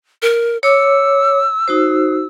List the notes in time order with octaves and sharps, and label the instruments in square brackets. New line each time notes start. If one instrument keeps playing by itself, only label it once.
[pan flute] A#4
[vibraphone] C#5 D6 [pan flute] E6
[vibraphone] D#4 F#4 C5